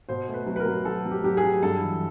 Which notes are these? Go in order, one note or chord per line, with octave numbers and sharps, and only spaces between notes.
B2 C5
A3
B4
F#3
B4
A#4
F#3
F#3 A4
F#3
G4
F#3 G4
G#4
F#3
G2 A4
E3